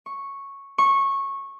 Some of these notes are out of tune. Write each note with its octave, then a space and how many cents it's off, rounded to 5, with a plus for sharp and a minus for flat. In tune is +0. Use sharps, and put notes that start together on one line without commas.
C#6 -5
C#6 -15